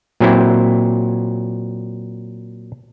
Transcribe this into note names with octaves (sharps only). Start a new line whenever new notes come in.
A#2 F#3 C4 E4